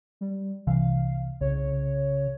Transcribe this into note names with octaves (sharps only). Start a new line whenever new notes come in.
G3
C2 C3 E3 F5
C2 C#3 C#5